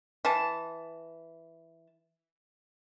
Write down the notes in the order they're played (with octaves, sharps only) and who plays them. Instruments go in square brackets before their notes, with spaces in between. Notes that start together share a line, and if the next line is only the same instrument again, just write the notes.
[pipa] E3 A5